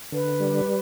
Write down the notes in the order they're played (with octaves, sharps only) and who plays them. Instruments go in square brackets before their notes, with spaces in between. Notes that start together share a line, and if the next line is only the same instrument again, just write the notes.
[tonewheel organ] D3 [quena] B4
[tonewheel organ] G3